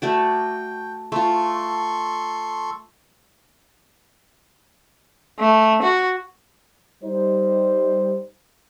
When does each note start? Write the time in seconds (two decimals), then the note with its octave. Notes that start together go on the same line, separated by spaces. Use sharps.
0.02 A3 F#4 D5 G5
1.12 A3 F4 A4 C6 C#6
5.38 A3
5.82 F#4
7.04 G3 D#4 C5